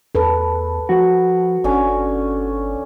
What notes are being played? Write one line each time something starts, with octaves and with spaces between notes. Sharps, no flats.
E2 A4 B4
F3 F#4
G1 D3 C#4